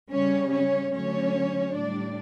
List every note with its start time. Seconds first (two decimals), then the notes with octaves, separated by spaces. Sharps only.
0.11 C#3 G3 C#4 C#5
0.51 C#4 C#5
0.93 D3 F#3 A3 C#4 C#5
1.74 A2 G3 D4 D5